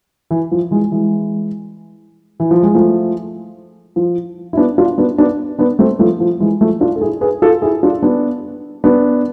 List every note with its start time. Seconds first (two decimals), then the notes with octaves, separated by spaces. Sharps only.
0.31 E3
0.52 F3
0.71 E3 G#3
0.92 E3 G#3
2.40 E3
2.51 F3
2.63 G#3
2.75 F3 A3
3.96 F3
4.53 E4
4.57 B3 D4
4.78 D4 F4
4.98 B3 D4
5.18 B3 D4
5.59 B3 D4
5.79 A3 C4
5.99 F3 A3
6.20 F3
6.40 E3 G#3
6.61 F3 A3
6.81 D4 F4
6.96 A4
7.01 E4 G#4
7.21 G#4 B4
7.42 F4 A4
7.62 E4 G#4
7.83 D4 F4
8.02 B3 D4
8.84 B3 D4